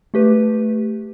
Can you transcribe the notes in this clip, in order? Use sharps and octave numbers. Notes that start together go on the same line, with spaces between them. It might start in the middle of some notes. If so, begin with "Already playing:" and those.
A3 G4 B4